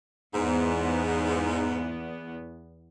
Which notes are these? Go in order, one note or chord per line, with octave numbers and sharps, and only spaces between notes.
E2 G#2 B3